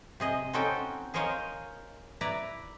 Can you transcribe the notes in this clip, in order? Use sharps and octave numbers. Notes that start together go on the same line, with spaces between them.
C3 G#4 D#5
C4 C#4 D#4 F#4 A4 G5
G#4 A#4 C5 C#5 D#5 F5
E4 B4 D5 A#5